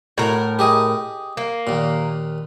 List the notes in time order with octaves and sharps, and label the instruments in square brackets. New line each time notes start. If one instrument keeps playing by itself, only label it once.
[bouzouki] A2 A#4 [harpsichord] F#4
[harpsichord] G4 G#4 D#5
[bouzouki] A#3
[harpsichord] D#2 A#2